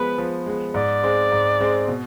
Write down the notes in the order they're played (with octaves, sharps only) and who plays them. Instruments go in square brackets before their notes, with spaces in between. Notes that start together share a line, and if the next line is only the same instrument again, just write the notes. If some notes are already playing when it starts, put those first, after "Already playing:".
Already playing: [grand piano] F3 G#3 B3 [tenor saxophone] B4
[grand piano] F3
G#3 B3
[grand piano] G#2 [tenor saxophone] D5
[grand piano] G#3 C4
G#2
G#3 C4
B2